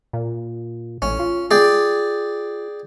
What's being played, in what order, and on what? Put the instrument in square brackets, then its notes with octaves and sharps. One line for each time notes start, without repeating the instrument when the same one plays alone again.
[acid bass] A#2
[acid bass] A1 [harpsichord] C#4
[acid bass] F4
[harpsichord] G#4 D5 G5